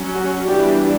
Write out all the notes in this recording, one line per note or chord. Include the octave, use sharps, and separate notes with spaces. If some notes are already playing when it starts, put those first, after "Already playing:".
Already playing: F#3 C#4
F#4
E3 G3 B3 D4 G4